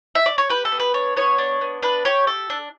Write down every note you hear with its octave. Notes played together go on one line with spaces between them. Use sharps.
E5
D5
C#5
G4 B4
A4
B3
B4
D4 C#5
B3 C#5
D4
B3
D4 B4
G4 C#5
A4
D4